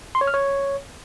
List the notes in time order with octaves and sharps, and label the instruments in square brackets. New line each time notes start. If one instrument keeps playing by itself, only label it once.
[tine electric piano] C6
C#5
F6
C#5